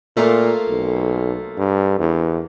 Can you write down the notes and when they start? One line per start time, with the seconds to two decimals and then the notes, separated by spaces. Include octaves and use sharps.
0.17 A#2 A3 A#3 F4
0.68 B1
1.57 G2
1.99 E2